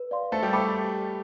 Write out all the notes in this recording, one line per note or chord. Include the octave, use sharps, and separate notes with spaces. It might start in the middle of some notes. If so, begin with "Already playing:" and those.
Already playing: B4
D5 F5 C6
A3 A4 C5
G3 G4
A3 A4 G5 B5 D6